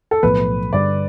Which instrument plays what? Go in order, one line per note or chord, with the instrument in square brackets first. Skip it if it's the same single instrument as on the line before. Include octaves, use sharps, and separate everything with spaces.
[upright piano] A4
[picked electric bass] B1 A2 F3 B3 [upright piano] B4
[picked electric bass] G2 D3 G3 [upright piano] D5